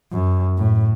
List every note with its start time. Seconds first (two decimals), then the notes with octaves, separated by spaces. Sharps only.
0.12 F#2
0.58 A2